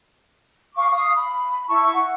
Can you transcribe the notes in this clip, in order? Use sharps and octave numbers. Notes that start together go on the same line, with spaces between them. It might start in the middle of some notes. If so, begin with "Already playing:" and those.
F5 C#6 D6
F5 D#6
B5
E4 A5 C#6
F#5